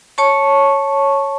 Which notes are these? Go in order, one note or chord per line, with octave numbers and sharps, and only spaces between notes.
C#5 A5 C#6